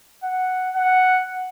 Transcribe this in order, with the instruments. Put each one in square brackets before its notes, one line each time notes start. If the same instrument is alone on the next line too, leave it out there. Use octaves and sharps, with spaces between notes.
[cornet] F#5
F#5